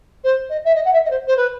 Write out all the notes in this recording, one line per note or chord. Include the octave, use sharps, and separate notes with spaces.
C5
D#5
E5
D#5
F#5
E5
D#5
C5
C5
B4